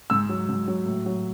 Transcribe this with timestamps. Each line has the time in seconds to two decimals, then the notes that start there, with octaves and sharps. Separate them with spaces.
0.10 G#2 E6
0.29 F#3
0.49 G#2
0.68 F#3
0.86 A2
1.06 F#3